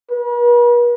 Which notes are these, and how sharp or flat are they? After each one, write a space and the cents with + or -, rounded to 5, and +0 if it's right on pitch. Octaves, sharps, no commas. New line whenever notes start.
B4 -45